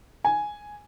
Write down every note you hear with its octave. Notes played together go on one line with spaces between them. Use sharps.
G#5